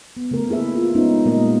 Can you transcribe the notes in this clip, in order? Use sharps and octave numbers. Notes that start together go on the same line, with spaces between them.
B3
C#3 A3 A#4
A#3 E4 G#4 B4 E5
F4
G#3 B3 C#4 D#4
A#2 G3 G#3 A#3 A#4 D#5